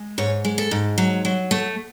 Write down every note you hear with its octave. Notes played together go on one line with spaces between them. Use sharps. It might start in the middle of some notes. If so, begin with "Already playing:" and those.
Already playing: G#3
G#2 C#5
G#3
A4
G#2
F#3
F#3
A3